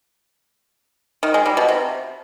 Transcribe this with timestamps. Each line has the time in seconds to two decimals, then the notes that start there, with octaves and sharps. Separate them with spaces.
1.23 D#3
1.34 G#3
1.46 G3
1.57 B2
1.68 C3